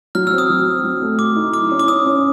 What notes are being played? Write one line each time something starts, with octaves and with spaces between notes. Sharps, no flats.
F#3 F6
E6
C4
D#6
F#3
C4
F#3
A3
A3 D6
D#4
E4 D6
C#4
D6
C#4 D#6
C#4